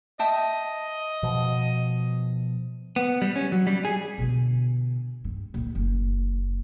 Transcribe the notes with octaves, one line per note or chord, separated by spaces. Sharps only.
D#5 E5 G5 A5
B2 F3
B3
G3
C#4
F#3
G3
G#4
B2 D3
G2
D#1 D3
F#1